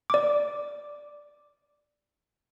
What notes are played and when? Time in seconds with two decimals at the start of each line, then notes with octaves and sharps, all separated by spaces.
0.10 D5 D6